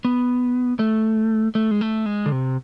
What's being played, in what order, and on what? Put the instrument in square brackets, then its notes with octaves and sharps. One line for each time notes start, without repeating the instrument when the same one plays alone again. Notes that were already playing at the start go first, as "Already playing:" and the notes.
[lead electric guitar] B3
A3
A3
G#3
A3
G#3
D3
C3